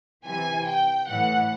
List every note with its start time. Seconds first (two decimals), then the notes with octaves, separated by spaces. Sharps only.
0.24 C3 E3 G#5
0.66 G5
1.08 A2 E3 F#5